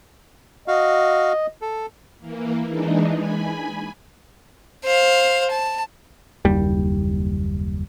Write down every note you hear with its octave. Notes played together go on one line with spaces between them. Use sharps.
F#4 D#5 F5
A4
E3 A#3
E3 G#3 D4 D#4
G#5 B5
C5 F5
A5
F#1 D#2 G3